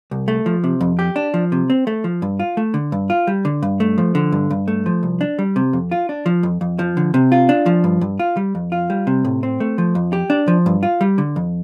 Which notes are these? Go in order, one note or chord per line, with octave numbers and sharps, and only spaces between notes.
C2
A3
F3
C3
F2
G4
D4
F3
C3
C4
A3
F3
G2
F4
A3
D3
G2
F4
G3
D3
G2
A3
F3
D3
G2
G2
A3
F3
C2
D4
G3
C3
F2
F4
D4
F3
F2
F2
F3
D3
C3
F4
D4
F3
G2
G2
F4
G3
F2
F4
G3
C3
A2
C4
A3
F3
F2
G4
D4
F3
G2
F4
G3
D3
F2